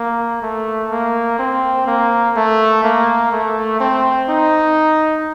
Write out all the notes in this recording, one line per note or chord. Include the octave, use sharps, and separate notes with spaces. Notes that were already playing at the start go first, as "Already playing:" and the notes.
Already playing: A#3
A3
A#3
C4
A#3
A3
A#3
A3
C4
D#4